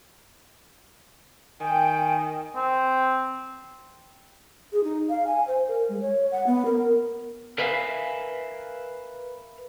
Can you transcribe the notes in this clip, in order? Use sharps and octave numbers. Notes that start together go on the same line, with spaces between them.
D#3 G5 G#5
C4
G#4
D#4
F5
G#5
C5
A#4
G#3
C#5
F#5
B3
A#4
A#4 B4 E5 F5 G#5